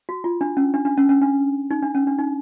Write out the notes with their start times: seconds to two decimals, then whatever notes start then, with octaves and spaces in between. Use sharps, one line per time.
0.09 F#4
0.24 F4
0.41 D4
0.57 C#4
0.74 D4
0.85 D4
0.97 C#4
1.09 C#4
1.22 D4
1.71 D#4
1.83 D4
1.95 C#4
2.07 D4
2.19 D#4